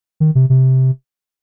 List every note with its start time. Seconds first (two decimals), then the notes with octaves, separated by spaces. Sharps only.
0.20 D#3
0.35 C3
0.50 C3